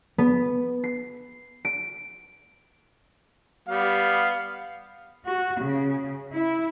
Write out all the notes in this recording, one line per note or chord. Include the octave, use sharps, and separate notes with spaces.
B3
C7
D7
G3 B3 F5
F#4
C#3
E4